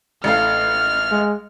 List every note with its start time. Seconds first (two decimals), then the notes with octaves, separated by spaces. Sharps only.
0.24 A1 A3 F5 F6
1.11 G#3